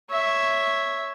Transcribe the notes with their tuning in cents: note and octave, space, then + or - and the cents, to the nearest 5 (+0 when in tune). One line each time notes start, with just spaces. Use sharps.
C#5 +0 E5 +0